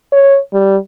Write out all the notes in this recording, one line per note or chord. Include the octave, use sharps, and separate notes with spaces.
C#5
G3